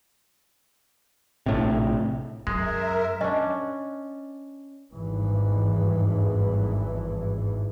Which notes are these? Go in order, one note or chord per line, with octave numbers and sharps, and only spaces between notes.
A#1 A2 C3
F#2 G#3 A#4 E5
C#4 D4 D#5
G#1 E2 G2 E3